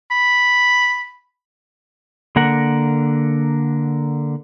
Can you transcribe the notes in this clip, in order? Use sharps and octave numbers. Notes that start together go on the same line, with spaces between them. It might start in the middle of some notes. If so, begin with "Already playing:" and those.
B5
D3 A#3 A#4 F#5